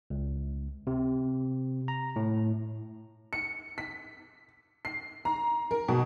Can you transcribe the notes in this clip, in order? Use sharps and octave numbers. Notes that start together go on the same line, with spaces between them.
C#2
C3
A#5
A2
C#7
B6
C7
A#5
A#4
B2